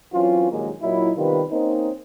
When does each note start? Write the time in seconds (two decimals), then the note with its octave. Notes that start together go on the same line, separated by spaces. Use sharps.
0.13 E3 F#3 C4 C#4 F4
0.51 A#1 D#2 F#3 G#3 A#3
0.81 A#2 F#3 D#4 E4
1.17 C3 D#3 G3 B3 F4 B4
1.51 A#3 C4 C#4 D#4